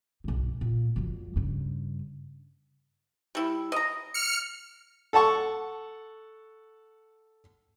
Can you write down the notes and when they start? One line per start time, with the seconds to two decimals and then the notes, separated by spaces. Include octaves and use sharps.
0.24 B1 G2
0.61 A#2
0.96 F2 F#3
1.36 G2 C#3
3.35 G3 E4
3.72 D#5 A#5
4.14 F6 C#7
5.13 A4 F#5 A5 C#6